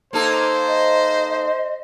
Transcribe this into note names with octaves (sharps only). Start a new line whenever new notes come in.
A#3 D#4 A4 C5
D#5